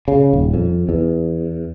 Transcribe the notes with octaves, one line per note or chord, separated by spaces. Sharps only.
C#3
D#1
F2
E2